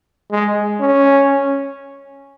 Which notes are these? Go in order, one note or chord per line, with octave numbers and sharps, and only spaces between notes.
G#3
C#4